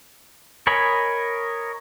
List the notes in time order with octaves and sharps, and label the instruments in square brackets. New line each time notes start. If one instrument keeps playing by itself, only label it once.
[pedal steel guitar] A#4 C#5 D#5 G#5 B5